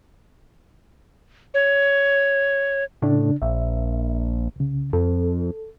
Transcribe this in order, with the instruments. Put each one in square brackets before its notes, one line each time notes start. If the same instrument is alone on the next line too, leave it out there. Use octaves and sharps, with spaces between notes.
[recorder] C#5
[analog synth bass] A2 [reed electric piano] C#3 D4
[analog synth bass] A#1 [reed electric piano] E5
[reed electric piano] C2 C#3
[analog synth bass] F2 [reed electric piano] A4